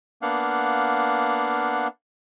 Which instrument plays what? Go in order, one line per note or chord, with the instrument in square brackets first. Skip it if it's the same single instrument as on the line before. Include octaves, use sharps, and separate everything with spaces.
[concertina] A#3 B3 D4 F5 F#5